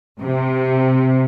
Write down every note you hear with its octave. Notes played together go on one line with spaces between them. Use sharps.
C3